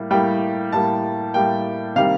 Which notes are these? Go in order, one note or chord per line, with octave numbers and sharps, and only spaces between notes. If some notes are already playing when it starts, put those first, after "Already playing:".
Already playing: A2 G3 A#3
A2 G3 A#3 G5
A2 G3 A#3 A5
A2 G3 A#3 G5
C3 D#3 G3 A#3 F5